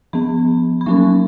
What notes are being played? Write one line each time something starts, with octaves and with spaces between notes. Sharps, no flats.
F3 B3 B5
B5
F#3 A#3 C#4 C#6